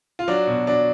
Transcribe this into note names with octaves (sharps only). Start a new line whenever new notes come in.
F4
F#3 D4
B2
F#3 D4